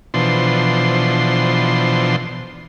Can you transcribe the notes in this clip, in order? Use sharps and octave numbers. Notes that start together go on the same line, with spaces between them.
B2 E3 F3 D4 C5 C6